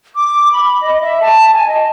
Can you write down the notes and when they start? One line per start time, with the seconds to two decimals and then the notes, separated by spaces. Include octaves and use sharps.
0.14 D6
0.52 B5
0.82 D#5
1.01 E5
1.21 A5
1.53 G#5
1.67 D#5